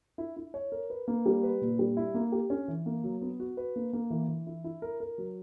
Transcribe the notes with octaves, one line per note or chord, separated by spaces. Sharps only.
E4
E4
C#5
A#4
B4
A#3
G3
B4
A#2
G3
E4
A#3
G4
C#4
E3
A#3
F#3
B3
F#4
B4
A#3
A#3
E3
E3
E4
E4
A#4
A#4
F#3